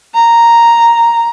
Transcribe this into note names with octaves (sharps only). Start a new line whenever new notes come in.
A#5